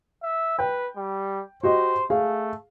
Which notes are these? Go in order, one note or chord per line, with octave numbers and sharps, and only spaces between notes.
E5
B4 G5
G3
F#4 G4 C5 D#5
A3 G#4 F5